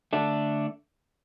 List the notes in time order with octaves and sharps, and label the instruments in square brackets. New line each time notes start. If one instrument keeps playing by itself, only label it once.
[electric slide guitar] D3 A3 D4